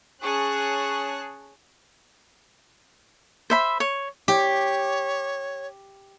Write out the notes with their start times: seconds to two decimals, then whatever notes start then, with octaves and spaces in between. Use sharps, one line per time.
0.21 C#4 G#4 A5 C#6 F#6
3.50 C5 E5 B5
3.80 C#5
4.28 G4 C#5